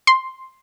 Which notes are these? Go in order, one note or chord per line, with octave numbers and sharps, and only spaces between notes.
C6